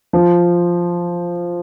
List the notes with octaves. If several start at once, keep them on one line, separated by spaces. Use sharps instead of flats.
F3